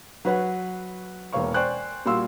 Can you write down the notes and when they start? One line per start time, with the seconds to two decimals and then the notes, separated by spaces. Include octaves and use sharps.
0.25 F#3 B4 C#5 F#5
1.33 E1 E2 A#3 C#5 F5 C#6
1.54 C5 D5 G5 G#5 C#6 F#6
2.05 A#2 G3 F#4 F5 C6 E6